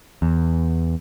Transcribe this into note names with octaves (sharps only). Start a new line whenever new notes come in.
E2